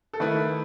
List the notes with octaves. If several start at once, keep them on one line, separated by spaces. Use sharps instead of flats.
A4
D#3 A3 E4 B4